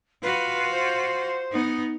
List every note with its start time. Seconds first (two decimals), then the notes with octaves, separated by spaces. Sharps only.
0.23 F4 F#4 B4
0.71 C5
1.52 B3 D#4